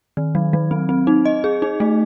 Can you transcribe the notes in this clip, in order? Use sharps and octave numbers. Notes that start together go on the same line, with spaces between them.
D#3
F#3
F#3
C4
C4
D#4
D#5
G#4
D#4
A3